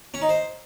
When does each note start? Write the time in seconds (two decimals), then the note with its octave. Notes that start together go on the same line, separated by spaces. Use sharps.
0.14 C#4
0.22 D#4
0.29 C5